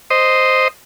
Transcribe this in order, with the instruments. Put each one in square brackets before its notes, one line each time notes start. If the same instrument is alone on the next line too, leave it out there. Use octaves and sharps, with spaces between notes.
[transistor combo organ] C5 D#5